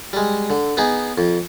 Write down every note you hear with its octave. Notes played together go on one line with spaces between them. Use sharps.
G3 G#3
D3
B3 D#4 G#4
F2